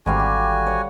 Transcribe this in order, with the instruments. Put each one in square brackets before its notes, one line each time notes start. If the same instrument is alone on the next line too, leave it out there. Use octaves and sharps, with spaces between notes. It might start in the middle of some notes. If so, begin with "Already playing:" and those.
[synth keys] G#1 [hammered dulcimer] D3 G3 F5 [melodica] F#4 G#5
[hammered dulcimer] G4
C#5 F#5